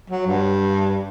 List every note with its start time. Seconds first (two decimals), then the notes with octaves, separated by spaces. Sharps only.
0.10 F#3
0.27 G2